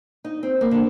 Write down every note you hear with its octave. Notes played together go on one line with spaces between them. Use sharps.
D#4
C4
A#3
D3